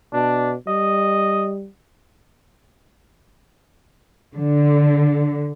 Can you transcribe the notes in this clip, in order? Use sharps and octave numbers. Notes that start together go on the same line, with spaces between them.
B2 D4
G3 D#5
D3